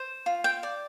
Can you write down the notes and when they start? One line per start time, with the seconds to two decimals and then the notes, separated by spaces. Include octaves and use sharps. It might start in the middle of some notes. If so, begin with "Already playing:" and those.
Already playing: C5
0.26 F4
0.44 G5
0.63 D5